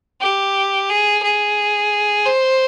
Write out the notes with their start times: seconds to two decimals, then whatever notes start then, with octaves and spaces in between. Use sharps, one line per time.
0.21 G4
0.90 G#4
1.23 G#4
2.26 C5